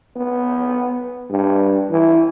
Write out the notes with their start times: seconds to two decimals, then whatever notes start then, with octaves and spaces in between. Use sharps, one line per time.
0.16 B3
1.30 G2
1.91 E3